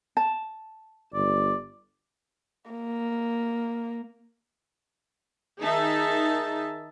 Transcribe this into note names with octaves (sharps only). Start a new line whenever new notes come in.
A5
G1 D5
A#3
D#3 D#4 G#4 E5 A5